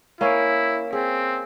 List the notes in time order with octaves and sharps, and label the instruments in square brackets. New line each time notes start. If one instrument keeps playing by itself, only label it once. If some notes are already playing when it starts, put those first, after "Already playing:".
[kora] A#3 C#4 [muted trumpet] E4
[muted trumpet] C4 [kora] G#4